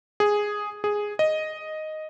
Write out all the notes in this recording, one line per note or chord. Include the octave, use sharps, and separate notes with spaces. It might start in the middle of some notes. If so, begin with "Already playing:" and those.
G#4
G#4
D#5